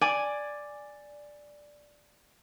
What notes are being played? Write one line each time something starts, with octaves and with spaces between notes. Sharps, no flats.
D5 G#5